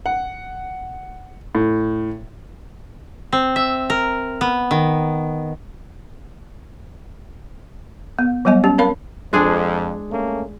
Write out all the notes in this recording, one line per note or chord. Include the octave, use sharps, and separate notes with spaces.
F#5
A2
C4
E5
A#4
B3
D#3
B3
F#3 G3 B3 D#5 G#5
C#4 G4
C4 A#4 C#5 F5 B5
F2 G#3 D4 G#4
A3 A#3 C#4